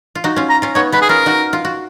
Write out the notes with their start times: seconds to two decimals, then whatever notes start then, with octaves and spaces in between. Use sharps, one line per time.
0.15 F4
0.24 D#4 F#4
0.36 C#4 F4
0.50 A#5
0.62 C#4 F4
0.75 B3 D#4 C#5
0.92 G#3 B3 B4
1.02 G#4
1.09 C#4 F4 A#4
1.26 D#4 F#4
1.53 F4
1.65 F#4